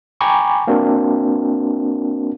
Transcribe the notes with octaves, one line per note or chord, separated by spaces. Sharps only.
G5 G#5 A#5 B5 C#6 D6
A#3 C4 D4 F#4 A#4